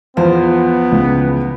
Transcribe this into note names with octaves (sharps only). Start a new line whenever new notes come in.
E2 F3 B3 F4 C5
C#2 C#3